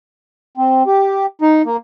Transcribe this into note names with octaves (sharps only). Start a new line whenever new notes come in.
C4
G4
D#4
A#3